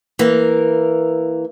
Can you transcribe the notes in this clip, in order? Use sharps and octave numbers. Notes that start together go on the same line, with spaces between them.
E3 A#3 A#4